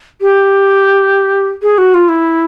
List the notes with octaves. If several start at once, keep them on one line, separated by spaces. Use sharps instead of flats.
G4
G#4
F#4
F4
E4